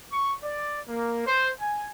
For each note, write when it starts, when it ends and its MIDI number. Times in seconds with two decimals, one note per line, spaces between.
0.13 0.32 85
0.43 0.80 74
0.88 1.23 58
1.25 1.50 72
1.60 1.88 80